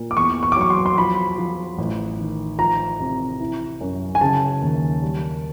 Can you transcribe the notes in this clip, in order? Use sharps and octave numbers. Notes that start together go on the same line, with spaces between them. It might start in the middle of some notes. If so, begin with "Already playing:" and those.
Already playing: A#2
D6
E2 C#6
C#6
D6
F#3 C#6
C6
C6
F3 B5
F3
A1
D#3
F3 A#5
C3
E3
F#2
G#5
C#3 A5
D#2
G3